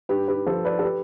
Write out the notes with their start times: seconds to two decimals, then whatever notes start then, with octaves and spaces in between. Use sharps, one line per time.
0.09 G2 G4 B4
0.28 G4 B4
0.46 F3 A4 C5
0.65 B4 D5
0.79 A4
0.83 G4 B4